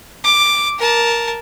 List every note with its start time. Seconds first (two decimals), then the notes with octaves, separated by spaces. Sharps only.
0.24 D6
0.78 A#4 A5